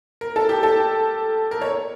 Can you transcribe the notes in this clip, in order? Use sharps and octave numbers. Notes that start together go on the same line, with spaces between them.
A#4
A4
G4
A4
A#4
C#5